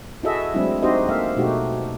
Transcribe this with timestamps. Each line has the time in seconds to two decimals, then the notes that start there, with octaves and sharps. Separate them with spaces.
0.23 E4 F#4 G#4 A4 D#5 E5
0.54 F#3 G#3 A3 C4 D4 E4
0.82 C4 D#4 F#4 G4 C5 D#5
1.09 A#3 A4 E5 F5
1.37 B2 A3 D#4 F#4 G4